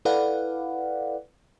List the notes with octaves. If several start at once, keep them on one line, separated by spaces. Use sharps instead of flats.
E4 A4 B4 D5 F5 F#5